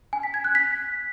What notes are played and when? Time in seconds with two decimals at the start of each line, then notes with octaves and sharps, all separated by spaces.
0.13 G#5
0.23 B6
0.34 G#6
0.44 F#6
0.55 B6